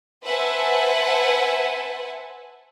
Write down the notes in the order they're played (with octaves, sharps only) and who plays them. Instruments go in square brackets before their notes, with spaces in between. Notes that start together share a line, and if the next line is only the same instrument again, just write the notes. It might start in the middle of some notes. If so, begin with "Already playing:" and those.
[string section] B4 C5 E5 F#5 G#5 A5